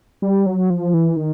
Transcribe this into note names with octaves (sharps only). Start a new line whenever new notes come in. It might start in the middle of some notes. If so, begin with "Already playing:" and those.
G3
F#3
F3
E3
D#3